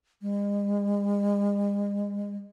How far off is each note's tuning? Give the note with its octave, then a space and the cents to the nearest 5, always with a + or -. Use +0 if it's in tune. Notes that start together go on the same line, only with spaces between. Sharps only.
G#3 -40